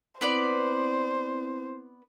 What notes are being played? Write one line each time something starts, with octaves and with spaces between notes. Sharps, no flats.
B3 C4 E4 B4 C5 D5